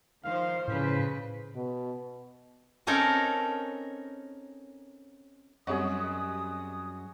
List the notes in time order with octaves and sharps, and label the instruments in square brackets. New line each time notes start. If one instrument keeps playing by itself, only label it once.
[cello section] D#3 F3 C5 [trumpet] F5
[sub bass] A2 [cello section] C#3 B4 [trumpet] C5
[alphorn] B2
[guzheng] C4 C#4 D#4 A4 A#4 C#5
[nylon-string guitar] F#2 [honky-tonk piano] G3 C4 D#5 [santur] F#4 G#4 [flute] D#6